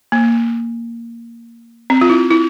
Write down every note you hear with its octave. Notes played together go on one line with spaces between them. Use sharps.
A#3
C4
F4
E4
E4